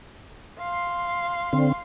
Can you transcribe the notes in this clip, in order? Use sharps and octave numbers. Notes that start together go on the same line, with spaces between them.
F5 C6
D3 C4